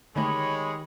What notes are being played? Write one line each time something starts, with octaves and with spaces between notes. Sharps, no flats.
D3 D#3 G#3 A3 G4 C#5 D#5 B5